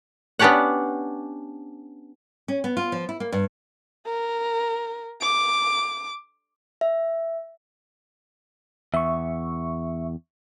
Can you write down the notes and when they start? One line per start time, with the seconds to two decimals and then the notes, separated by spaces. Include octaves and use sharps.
0.39 B3 C#4 D4 G4 C#5 F#5
2.48 C#4
2.64 B3
2.77 F4
2.92 F3
3.09 E4
3.20 A#3
3.32 G2
4.06 A#4
5.21 D6
6.81 E5
8.94 E2 E5 C#6